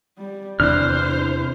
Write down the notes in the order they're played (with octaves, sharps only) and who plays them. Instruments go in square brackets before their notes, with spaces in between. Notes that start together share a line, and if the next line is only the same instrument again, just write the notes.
[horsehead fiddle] G3
[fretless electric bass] E2 C3 E3 [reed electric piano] D4 F#6 [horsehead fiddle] E4 C5 [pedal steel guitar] F6